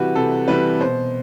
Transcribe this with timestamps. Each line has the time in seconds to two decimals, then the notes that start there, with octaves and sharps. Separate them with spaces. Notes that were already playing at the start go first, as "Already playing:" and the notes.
Already playing: C3 E3 G3 F#4 G4 B4
0.15 C3 A4
0.48 E3 G3 B4
0.80 B2 C5